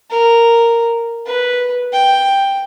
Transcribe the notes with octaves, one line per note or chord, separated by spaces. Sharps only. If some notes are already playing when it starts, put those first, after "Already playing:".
A#4
B4
G5